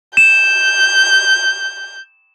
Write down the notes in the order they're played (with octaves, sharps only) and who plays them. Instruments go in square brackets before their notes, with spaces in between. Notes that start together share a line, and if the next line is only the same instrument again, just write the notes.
[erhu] G6 [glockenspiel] E7